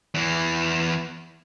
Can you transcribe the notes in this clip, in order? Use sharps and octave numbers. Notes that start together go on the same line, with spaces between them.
E2 E3